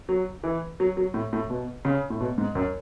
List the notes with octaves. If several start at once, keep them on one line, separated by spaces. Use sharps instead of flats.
F#3
E3
F#3
F#3
A2
A2
B2
C#3
A2
B2
G#2
F#2